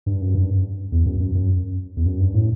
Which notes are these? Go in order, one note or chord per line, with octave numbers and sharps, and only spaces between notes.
G2
F#2
G2
E2
F#2
F#2
F#2
E2
F#2
G2
A2